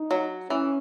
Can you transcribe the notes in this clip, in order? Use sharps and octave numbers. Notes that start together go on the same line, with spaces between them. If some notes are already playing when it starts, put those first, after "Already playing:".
Already playing: D#4
F#3
E3 C#4